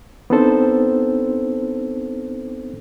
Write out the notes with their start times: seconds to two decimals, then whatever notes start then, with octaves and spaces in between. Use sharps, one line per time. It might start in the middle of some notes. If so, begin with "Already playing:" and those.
0.30 B3 C4 D4 D#4 A4 C5